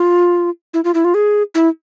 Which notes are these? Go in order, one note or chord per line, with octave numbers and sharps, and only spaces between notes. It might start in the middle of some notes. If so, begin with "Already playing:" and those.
Already playing: F4
E4
F4
E4
F4
G#4
E4